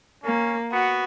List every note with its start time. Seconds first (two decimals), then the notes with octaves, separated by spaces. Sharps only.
0.24 A#3 C#4
0.72 B3 F#4